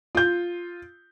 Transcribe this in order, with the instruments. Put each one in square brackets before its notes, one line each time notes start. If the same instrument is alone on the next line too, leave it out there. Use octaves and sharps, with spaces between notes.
[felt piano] F4 G6